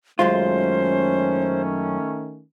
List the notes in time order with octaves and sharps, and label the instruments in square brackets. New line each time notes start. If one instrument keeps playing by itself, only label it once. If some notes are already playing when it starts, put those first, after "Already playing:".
[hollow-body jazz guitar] F#2 G#3 F4 [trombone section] D#3 A3 C#4 [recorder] C5